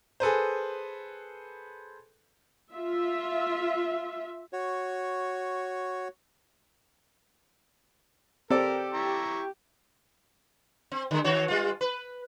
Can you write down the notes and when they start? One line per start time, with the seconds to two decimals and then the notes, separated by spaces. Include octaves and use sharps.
0.20 G#4 A4 B4 C5
2.73 F4 E5
4.53 F#4 C#5
8.50 C4 G4 A4 A#4 D5
8.94 E4 A#5 C#6
10.92 C4
11.11 D3 G#3
11.24 D#3 F#4 C#5
11.48 G3 F4
11.81 B4